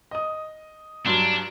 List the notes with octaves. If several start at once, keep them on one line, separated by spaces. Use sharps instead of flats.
D#5 D#6
G2 F#3 D4 C6